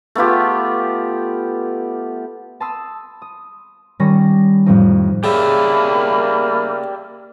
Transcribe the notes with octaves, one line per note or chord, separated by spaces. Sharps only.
A3 B3 F4 G4
A5 B5 C6 D#6 E6
D#6
D#3 G3 C#4 B5 A#6
F2 A2 F3 G3 C4 D#4
C#3 A#3 G4 D5 E5 B5